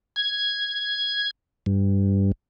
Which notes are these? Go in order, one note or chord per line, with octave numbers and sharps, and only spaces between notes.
G#6
G2